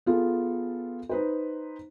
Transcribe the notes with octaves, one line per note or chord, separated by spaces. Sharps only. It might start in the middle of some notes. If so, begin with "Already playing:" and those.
B3 F4 G#4 A4
D#4 B4 C5